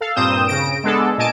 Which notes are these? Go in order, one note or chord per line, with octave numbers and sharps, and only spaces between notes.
A4 F5
G2 A#2 C4 D#6 G6 E7
C#3 A#6 D7
G#3 B3 D4 G#4 A4
A#2 D#5 G#5 A5 D7